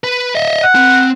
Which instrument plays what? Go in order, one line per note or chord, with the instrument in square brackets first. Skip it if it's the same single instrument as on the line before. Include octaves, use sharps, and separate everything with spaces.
[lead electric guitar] B4
D#5 E5
[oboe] F#5
[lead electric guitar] C4